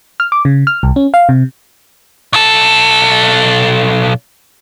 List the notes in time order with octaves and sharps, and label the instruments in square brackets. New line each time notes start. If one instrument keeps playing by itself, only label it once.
[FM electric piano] F6
D6
C#3
F6
C2
C#4
F5
C3
[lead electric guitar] B1 A4